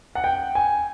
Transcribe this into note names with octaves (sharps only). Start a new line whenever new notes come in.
F#5
G5
G#5